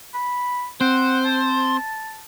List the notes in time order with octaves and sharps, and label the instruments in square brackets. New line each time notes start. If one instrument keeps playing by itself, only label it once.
[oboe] B5
[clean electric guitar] C4 [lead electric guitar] C5 [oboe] F#5
[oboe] A5